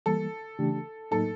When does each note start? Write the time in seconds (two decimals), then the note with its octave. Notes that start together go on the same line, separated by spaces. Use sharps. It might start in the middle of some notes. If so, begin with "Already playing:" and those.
0.06 E3 G3 A#3 A4
0.59 C#3 E3 A3 D4 G4
1.11 A2 F#3 A#3 D#4 A4